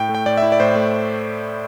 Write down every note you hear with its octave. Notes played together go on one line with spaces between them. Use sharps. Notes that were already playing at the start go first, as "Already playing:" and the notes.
Already playing: A2 G5
A3
G5
A2 D5
E5
E4
D5
A2 C5
A3